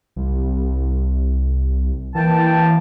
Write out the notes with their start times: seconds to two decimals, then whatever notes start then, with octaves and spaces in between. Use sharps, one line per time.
0.16 C2
2.15 E3 A#3 G5 A5